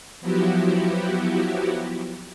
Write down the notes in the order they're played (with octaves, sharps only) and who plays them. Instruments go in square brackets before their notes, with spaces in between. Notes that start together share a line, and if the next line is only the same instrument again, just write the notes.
[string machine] F3 F#3 B3 E4 F#4 G4